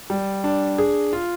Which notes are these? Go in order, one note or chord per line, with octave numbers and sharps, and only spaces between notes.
G3
D4
G#4
F4